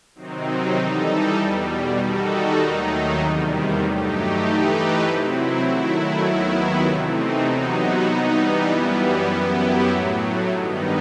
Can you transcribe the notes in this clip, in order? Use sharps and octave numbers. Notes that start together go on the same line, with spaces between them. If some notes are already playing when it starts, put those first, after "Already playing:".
C3 D#3 F#3 C4 D#4
E3 G3 D#4 A4
E2 B2 G3
D#3 G3 D#4 F#4 A4
D#2 D#3 F#3 A3 D#4
E2 C3 D#3 G3
G2 F#3 A3 D#4 G4
E3 A3 D#4 G4 B4
C3 F#3 C4 E4
D#3 F#3 A3 E4
D#2 D#3 F#3 B3 E4
C3 E3 A3 C4 D#4
C3 F#3 B3 D#4 F#4
E3 G3 B3 D#4
F#2 E3 G3 B3
F#2 F#3 B3 E4 G4
A2 F#3 A3
G2 D#3 G3 B3 D#4